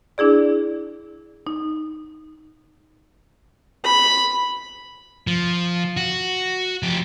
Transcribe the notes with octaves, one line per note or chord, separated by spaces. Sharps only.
D4 E4 G#4 D5
D#4
B5
F3
F#4
F3 G4